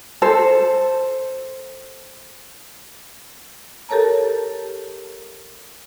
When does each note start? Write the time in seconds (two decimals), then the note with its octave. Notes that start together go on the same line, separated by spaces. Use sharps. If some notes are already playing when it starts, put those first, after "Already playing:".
0.22 A4 C5
3.89 G4 A4 A#4 C#5 A5 A#5